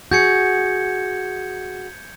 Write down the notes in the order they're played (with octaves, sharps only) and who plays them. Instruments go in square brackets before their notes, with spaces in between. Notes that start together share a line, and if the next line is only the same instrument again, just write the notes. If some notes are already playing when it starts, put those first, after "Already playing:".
[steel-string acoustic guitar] F#4 G#4 [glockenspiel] G6 G#6 C#7